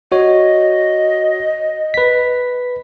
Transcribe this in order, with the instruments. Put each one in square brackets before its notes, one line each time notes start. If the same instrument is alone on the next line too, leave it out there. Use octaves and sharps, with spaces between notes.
[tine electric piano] F#4 C#5 [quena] D#5
[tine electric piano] B4 B6